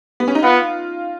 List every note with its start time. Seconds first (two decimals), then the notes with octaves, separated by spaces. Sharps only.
0.20 B3
0.28 C#4
0.35 D#4
0.43 B3 F4